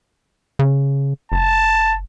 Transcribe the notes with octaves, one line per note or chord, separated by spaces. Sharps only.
C#3
F#1 A5